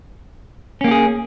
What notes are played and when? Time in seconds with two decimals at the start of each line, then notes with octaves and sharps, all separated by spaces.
0.81 C#4
0.84 A#3
0.88 G4
0.91 G#4